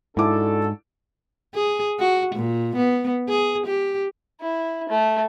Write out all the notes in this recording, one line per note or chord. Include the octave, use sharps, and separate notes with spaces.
G#2 D4 E4 F#4 A4 D6
G#4
F#4
A#2
B3
G#4
G4
E4
A3